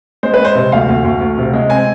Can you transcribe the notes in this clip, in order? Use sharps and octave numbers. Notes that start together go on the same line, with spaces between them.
G#3 C5
B4
G#3
C5
C3
D2 F5
D2
D2
D2
C3
G#3
C4 G#5